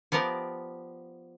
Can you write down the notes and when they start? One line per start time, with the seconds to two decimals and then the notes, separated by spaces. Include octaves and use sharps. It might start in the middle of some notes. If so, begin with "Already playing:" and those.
0.12 F3 B3 G4 A#4 D5